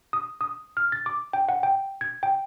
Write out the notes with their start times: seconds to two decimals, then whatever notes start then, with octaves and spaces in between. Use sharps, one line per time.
0.13 D#6
0.41 D#6
0.77 F6
0.92 A6
1.06 D6
1.33 G5
1.49 F#5
1.63 G5
2.01 G#6
2.23 G5